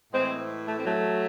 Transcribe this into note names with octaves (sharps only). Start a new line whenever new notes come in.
A2 E3 G#3 C4
A3
C4
F#3 A3